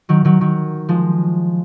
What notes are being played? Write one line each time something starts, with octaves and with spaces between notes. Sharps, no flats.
D#3 F#3
D#3 F#3
D#3 F#3
F3 G#3